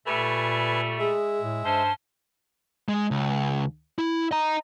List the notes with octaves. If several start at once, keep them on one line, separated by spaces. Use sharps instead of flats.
A#2 G3 A3 B4 G#5
G#3 G#4 E5
A2
G2 C#4 C5 A5
G#3
C#2
E4
D#5 A#5